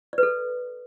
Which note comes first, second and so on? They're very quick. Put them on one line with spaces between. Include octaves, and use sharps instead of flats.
D5 B4 A4